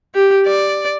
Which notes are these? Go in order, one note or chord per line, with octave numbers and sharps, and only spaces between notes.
G4
D5